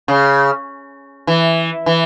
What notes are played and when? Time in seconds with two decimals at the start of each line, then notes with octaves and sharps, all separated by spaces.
0.08 C#3
1.27 E3
1.86 E3